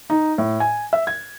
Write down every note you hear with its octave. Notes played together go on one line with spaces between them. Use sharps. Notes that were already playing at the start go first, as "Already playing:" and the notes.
D#4
A2
G#5
E5
G#6